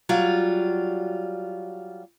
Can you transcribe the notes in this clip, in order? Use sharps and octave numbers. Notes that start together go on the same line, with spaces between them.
F#3 G3 F4